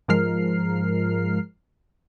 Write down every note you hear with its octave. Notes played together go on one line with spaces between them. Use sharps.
G#2 F3 G#3 A#4 F6 C7